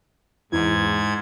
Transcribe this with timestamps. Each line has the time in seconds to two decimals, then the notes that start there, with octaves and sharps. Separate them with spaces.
0.52 E2 G#2 G#6